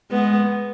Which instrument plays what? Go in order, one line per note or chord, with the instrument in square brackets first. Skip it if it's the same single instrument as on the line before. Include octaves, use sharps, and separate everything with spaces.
[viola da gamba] G#3 B3